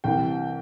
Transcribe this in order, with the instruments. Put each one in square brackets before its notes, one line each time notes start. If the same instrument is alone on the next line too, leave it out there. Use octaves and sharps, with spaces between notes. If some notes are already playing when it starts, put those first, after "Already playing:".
[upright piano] C2 C3 E3 G5